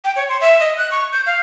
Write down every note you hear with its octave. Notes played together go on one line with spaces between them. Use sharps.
G5
C#5
C6
E5
D#5
F#6
C#6
G6
F5